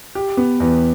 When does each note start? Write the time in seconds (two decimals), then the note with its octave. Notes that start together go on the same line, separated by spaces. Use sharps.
0.15 G4
0.37 B3
0.60 E2